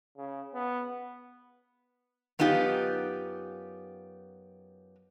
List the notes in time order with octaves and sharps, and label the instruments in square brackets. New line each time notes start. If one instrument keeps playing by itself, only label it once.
[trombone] C#3
B3
[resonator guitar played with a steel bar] F#2 B3 D#4 F4 G4